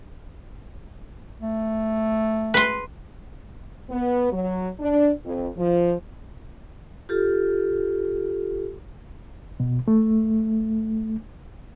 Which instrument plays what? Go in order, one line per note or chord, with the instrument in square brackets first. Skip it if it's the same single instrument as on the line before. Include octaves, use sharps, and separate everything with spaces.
[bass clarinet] A3
[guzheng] B4 C6
[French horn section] B3
F#3
D4
F2
F3
[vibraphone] F4 G4 A4
[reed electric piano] B2
A3